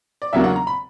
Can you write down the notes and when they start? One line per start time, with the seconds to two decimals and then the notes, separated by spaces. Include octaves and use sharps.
0.22 D5
0.33 E2 C#3 F#3 A#3 D4 E5
0.44 F#5
0.56 A#5
0.67 B5